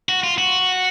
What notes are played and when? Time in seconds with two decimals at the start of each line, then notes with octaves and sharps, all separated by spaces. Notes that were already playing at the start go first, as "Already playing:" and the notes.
0.09 F#4
0.24 F4
0.38 F#4